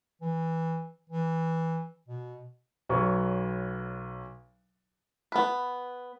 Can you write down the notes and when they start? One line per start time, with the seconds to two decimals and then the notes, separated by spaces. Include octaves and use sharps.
0.22 E3
1.10 E3
2.08 B2
2.89 B1 F#3 B4 C#5 C#6
5.32 B3 B4